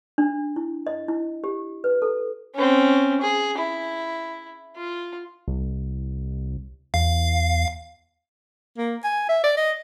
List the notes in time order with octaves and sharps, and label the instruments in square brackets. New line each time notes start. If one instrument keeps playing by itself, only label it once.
[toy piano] D4
E4
D#5
E4
G4
B4
A4
[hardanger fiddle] C4 C#4
G#4
E4
F4
[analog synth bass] C2
[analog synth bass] E2 [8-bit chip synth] F5
[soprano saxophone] A#3
G#5
E5
D5
D#5